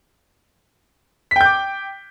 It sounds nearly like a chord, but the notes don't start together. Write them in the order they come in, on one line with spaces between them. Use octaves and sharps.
B6 G5 G6 D6